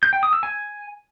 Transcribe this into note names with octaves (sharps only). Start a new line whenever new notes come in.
G6
G5
D#6
E6
G#5